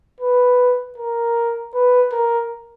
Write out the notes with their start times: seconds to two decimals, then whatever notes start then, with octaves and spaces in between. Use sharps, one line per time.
0.20 B4
0.98 A#4
1.74 B4
2.12 A#4